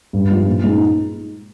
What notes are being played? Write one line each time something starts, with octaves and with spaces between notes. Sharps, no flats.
G2
F3 G#3
A#2
G#3 D#4